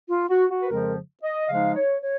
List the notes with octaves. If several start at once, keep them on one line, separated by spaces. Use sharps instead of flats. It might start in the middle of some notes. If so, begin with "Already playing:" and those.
F4
F#4
F#4
B4
F2 C#3 F3 G#3 A#4
D#5
C#3 F3 G#3 D#4 F5
C#5
C#5